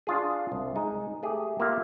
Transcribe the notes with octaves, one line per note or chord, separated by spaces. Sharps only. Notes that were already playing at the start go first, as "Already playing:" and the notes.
D4 F4 G#4
C2
G#3 D#4
A3 G4 G#4
A#3 F4 G4 E5 F5